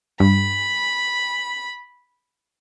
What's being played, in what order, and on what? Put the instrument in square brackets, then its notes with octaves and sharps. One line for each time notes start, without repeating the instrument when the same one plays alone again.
[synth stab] G2 [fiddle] B5